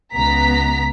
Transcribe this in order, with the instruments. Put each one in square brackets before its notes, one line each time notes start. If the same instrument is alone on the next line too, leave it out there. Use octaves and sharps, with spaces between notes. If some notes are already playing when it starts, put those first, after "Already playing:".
[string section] C#2 B3 A#5 B6